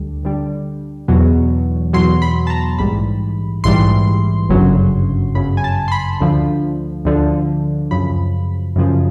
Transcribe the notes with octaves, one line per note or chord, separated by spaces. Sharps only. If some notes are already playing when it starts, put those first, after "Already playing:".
Already playing: D2 D3 G3
D2 D3 G3
E2 B2 F#3
E2 B2 F#3 C6
B5
A5
A#5
A#1 G#2 E3 G3 B5
A#1 G#2 E3 G3 C6
G1 F#2 C#3 F#3
G1 F#2 C#3 F#3 B5
G#5
A5
C6
B5
D2 D3 F3
D2 D3 F3
F#2 C#3 F3 B5
F#2 C#3 F3